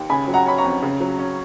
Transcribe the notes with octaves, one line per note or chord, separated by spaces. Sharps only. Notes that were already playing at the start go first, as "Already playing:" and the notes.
Already playing: D#2
C#3 G#5 B5
F#3
F#5 A#5
C#4 B5
A#5 C#6
F2
C#3
F#3
C#4